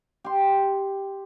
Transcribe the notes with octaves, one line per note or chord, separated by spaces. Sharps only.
G4 C6